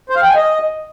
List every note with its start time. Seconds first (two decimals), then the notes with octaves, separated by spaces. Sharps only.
0.10 C5
0.16 F5
0.22 G5
0.29 G#5
0.35 D#5